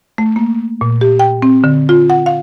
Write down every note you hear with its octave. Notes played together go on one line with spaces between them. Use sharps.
A3
A#3
A#2
G4
G5
C4
D3
F4
F#5
F5